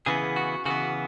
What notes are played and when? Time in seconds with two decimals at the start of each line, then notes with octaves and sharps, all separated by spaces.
0.06 C#3 E3 B3 G#4
0.36 F#4
0.66 C#3 E3 B3 F#4